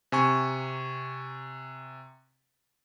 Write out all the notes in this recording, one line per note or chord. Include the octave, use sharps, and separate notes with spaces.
C3 G#5 C#6